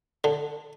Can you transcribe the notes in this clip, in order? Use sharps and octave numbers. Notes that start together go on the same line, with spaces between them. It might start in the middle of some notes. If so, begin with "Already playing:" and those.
D3